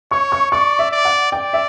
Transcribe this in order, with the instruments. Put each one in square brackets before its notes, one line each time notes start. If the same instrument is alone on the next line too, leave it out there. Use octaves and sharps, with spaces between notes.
[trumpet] C#5 [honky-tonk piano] C#6
[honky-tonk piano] C#6
[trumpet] D5 [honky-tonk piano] C#6
[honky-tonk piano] E5
[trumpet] D5
[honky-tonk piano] F#5
[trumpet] D5 [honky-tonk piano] G5
[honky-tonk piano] E5